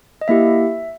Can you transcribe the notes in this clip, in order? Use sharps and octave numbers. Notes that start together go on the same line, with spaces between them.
D#5
A#3 E4 G4 E5